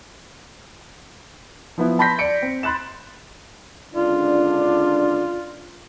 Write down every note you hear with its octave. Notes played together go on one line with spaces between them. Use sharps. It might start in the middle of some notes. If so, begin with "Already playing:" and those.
F3 B3 E4
A5 B5 C6 G6 A#6 B6
D5 C#7 D7
C4
B5 C6 F#6 A6 E7
C#2 D3 D4 F4